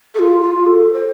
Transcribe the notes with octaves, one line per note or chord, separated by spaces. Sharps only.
A4
F4
F4
A4
C5